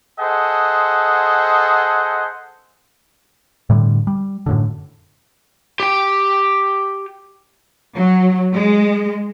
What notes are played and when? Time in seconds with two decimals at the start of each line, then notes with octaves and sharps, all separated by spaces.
0.20 G#4 A4 C5 D#5 F#5
3.70 A2 D3 G3
4.07 G3
4.46 F#2 A2 D3
5.80 G4 G5
7.96 F#3
8.54 G#3